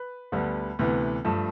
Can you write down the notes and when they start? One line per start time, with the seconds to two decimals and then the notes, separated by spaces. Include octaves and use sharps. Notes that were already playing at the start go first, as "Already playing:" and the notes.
Already playing: B4
0.32 D2 D3 G3 B3
0.79 D2 C3 E3 B3
1.25 G2 F3 A3